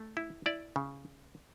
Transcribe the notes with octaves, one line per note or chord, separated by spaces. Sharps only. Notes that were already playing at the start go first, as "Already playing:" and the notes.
Already playing: A3
E4
E4 D5
C#3